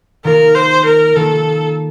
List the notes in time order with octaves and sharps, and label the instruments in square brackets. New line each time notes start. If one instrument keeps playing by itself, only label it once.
[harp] D#3 A#3 F4 [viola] A#4
[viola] C5
A#4
[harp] D#3 A#3 F4 [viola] A4